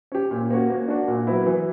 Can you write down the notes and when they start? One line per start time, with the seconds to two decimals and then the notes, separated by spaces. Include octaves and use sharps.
0.12 C#4 G4
0.31 A#2
0.50 A#3 C#4 F#4
0.70 A#3
0.88 D4 F#4
1.08 A#2
1.27 F#3 B3 E4
1.46 E3